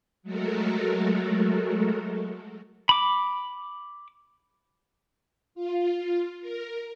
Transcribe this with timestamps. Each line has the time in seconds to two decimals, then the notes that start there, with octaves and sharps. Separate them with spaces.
0.23 F#3 G#3 A3 F#4 A4 A#4
2.89 B5 D6
5.55 F4
6.41 A#4